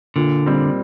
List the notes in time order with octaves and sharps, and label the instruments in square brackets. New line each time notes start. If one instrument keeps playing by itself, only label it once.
[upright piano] A#2 [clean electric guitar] D3
[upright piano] G3 C4